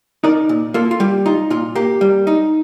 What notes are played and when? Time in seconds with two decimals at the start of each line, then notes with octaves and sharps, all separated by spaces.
0.24 D#4 A#4 D5
0.49 A#2
0.74 A#3 F4 A4
0.91 F4
1.00 G3 G4
1.26 D#4 F4
1.50 A#2 F4
1.75 A#3 G4
2.01 G3
2.27 D#4